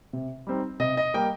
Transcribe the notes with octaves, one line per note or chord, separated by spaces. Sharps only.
C3
G3 C4 D#4
C3 D#5
D#5
G3 A#3 G5